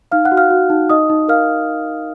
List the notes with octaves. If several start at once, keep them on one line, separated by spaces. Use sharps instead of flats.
D#4 F5 F6
F#5 F#6
F#4
F5 F6
F#4
D#4
D#4 D#5 D#6
D#4
A#4 F5 F6